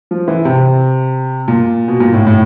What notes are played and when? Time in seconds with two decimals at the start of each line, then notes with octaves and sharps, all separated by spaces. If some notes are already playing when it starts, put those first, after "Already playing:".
0.11 F3
0.28 E3
0.45 C3
1.48 A#2
1.88 B2
2.00 A#2
2.14 A2
2.27 A2